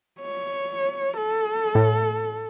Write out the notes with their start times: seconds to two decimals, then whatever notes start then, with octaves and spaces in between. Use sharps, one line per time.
0.21 C#5
1.17 A4
1.75 A2